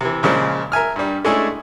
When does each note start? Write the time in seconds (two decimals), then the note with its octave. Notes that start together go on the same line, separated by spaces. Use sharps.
0.01 C3 E3
0.23 A#2 C#3 F3 G#3
0.72 A#4 E5 G#5 F6
0.96 G2 G3
1.25 G#3 A3 C#4 D4 E4 G#4